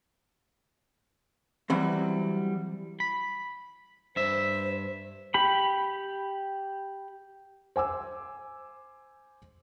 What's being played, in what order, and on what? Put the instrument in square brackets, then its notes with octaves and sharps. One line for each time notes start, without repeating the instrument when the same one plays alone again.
[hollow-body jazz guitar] E3 F#3 G3 C4
[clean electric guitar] B5
[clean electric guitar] G2 E5 [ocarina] C5
[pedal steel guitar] G4 B5
[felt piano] C5 G#5 D6 E6